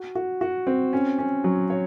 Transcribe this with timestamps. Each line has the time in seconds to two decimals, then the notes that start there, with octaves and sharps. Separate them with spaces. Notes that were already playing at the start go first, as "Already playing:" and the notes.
Already playing: F#4
0.15 F#4
0.41 F#4
0.67 C4
0.93 C#4
1.18 C#4
1.44 F#3
1.70 C#5